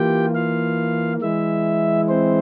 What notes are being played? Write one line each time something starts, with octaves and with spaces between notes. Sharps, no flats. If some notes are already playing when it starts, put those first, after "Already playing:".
Already playing: E3 A#3 F4 G4 G5
F4 F5
E3 G#3 E4 E5
C4 C5